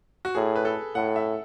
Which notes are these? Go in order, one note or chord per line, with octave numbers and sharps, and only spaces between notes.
F#4
A2 G#4
B4
A4
A2 F#5
E5